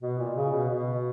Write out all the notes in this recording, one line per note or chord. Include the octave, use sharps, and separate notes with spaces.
B2
A#2
C#3
B2
B2